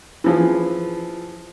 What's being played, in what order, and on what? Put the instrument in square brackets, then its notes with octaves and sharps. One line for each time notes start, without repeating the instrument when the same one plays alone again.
[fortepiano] E3 F3 G#4